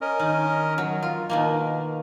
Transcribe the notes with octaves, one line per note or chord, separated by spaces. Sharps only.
C#4 A#4 D#5
D#3
F#3
F4 A#4
B2 D#3 A#3